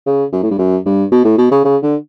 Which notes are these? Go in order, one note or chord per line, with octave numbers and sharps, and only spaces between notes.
C#3
F#2
A2
G2
F#2
G2
B2
A2
B2
C#3
C#3
D3